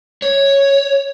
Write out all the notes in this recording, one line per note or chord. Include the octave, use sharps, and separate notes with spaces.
C#5